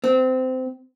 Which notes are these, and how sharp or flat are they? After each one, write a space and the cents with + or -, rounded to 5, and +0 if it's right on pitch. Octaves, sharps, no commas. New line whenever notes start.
C4 -20